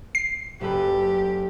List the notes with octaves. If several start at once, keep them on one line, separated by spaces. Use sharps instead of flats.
C7
F#1 G4 A4 B4